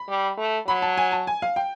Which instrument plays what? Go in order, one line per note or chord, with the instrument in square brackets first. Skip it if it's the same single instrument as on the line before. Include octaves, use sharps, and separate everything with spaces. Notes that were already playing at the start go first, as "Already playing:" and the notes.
Already playing: [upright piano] B5
[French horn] G3
A3
[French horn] F#3 [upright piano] B5
[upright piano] A5
G#5
A5
G#5
F5
G5